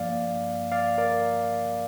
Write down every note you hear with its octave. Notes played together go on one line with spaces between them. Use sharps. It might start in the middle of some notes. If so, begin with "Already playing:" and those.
Already playing: G2 F3 A#3 D5 F5
D5 F5
A#4 D5